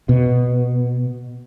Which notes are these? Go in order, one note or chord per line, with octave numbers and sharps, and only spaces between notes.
B2